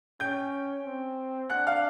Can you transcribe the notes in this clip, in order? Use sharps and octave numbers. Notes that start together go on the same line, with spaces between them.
C#4 G5 G6
C4
D4 F#5 F#6
F5 F6